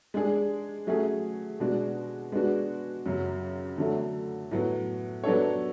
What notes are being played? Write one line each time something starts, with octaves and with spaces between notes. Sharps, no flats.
G#3 D4 G#4
F#3 A3 C#4 G#4
B2 G#3 D4 F#4
G#3 B3 D4 F#4
F#2 C#3 F#3
D3 F#3 A3
A2 F#3 B3
F#3 B3 D4 A4 C#5